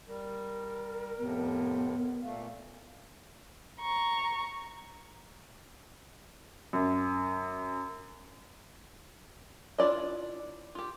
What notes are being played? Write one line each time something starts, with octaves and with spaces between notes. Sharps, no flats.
G3 A#4
F2 A2 C3 B3
A#2 A3 F5
A#5 C#6
F#2
D4 E4 F4 D5 D#5
F4 G4